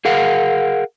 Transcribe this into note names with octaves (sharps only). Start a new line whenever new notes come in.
G#4 A#4 F5 F#5